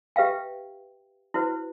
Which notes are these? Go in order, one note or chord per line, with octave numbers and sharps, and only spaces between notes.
G4 B4 E5 F5 G5
E4 F#4 B4 C5